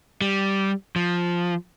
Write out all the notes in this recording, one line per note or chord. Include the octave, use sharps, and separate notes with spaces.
G3
F3